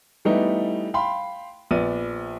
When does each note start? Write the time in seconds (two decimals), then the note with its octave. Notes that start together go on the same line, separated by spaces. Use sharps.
0.25 E3 G3 A3 B3 D#4
0.94 F5 G5 B5 C6
1.71 A#1 B3 D5 D#7